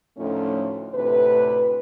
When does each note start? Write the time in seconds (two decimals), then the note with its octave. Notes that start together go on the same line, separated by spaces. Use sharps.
0.18 D2 A2 F3 A3 C#4 D#4
0.94 D2 A2 C3 B4